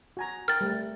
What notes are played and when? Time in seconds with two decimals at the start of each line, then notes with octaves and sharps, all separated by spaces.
0.17 F#4 G#5 A#5
0.48 A#4 G5 F6 A6
0.61 G3 A3